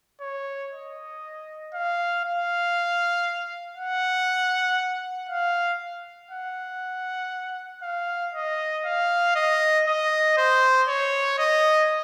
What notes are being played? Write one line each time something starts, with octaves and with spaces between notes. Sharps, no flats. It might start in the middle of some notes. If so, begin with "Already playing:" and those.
C#5
D#5
F5
F5
F#5
F5
F#5
F5
D#5
F5
D#5
D#5
C5
C#5
D#5